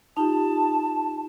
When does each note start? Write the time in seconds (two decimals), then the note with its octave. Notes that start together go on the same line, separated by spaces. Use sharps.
0.17 D#4 F4 G4 A5